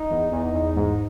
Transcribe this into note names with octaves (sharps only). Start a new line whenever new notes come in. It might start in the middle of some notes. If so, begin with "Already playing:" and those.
Already playing: D#4
E2
E2
E2
G#2